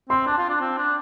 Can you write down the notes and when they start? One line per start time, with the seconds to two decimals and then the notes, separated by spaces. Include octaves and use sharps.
0.09 C4 C6
0.26 D4 A5
0.38 F4
0.49 D4
0.61 C4
0.78 D4